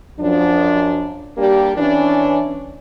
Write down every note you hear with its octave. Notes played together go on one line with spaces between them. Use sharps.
F#2 F3 D4
G3 A#3 D4 G4
E3 C#4 D4